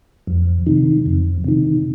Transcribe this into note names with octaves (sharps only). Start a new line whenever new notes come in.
F2
C3 D#3
F2
C3 D#3